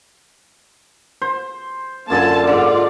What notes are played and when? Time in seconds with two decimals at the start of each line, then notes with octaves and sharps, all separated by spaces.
1.22 C5
2.10 F#2 D3 A#3 F4 G#5 A5
2.47 G#2 D3 F4 D5